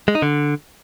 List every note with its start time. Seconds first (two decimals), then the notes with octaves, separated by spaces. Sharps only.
0.08 G#3
0.15 D#4
0.22 D3